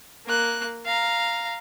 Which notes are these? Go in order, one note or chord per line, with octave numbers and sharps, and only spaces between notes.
A#3 F#6
F5 A#5